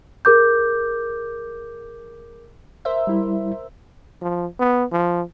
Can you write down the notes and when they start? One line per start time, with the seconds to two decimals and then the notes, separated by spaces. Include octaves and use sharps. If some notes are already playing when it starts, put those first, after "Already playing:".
0.25 G#4 A#4 D6 G6
2.85 A#4 C5 E5
3.07 G3 E4
4.22 F3
4.59 B3
4.92 F3